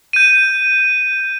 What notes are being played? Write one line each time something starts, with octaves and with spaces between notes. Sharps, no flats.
G6 D#7